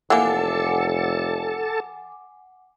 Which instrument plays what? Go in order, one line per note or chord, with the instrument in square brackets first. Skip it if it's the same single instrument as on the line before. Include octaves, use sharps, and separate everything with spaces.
[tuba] F1 [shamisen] E3 A#3 [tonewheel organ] A4 A5 [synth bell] F#5 G#5 D6